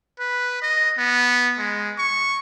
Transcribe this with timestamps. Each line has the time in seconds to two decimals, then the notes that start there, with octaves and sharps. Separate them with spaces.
0.19 B4
0.62 D#5
0.98 B3
1.58 G#3
1.98 C#6